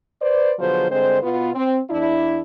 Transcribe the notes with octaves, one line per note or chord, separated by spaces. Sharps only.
B4 C5 D5
B2 D3 F3 F#3 G#4 C5
G2 D3 G#3 C4 C5
B2 B3 F4
C4
E2 D4 E4